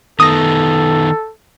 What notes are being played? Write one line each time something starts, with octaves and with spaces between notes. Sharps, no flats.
D#3 B3 A4 D#6 A#6